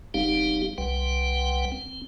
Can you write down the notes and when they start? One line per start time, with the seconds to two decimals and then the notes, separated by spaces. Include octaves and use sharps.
0.14 F#1 G3 C4 D#4 G4 F5
0.78 C2 G3 B4 F#5 G5
1.72 C4